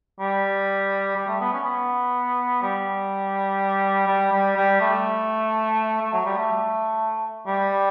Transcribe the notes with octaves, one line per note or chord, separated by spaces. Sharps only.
G3
G3
A3
B3
C#4
B3
G3
G3
G3
G3
A3
A3
F#3
G3
A3
G3